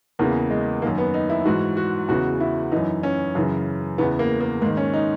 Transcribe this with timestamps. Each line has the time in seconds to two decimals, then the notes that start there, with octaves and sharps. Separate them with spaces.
0.19 E2 C#3 E3 A#3
0.50 G#3
0.82 D#3 A#3
0.86 F#2
0.98 B3
1.14 D#4
1.30 E4
1.45 G#2 E3 F#4
1.77 F#4
2.08 E2 C#3 E3 F#4
2.40 E4
2.72 F#2 E3 D#4
3.03 C#4
3.35 F#2 C#3 E3
3.98 E2 C#3 E3 B3
4.19 A#3
4.41 A#3
4.61 G#2 A#3
4.66 D#3
4.77 C#4
4.93 D#4